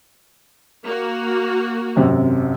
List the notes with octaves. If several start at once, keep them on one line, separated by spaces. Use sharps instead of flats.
A#3 F#4
G#1 F#2 C3